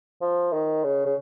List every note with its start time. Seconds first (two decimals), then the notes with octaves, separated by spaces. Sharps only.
0.21 F3
0.53 D#3
0.84 C#3
1.06 C#3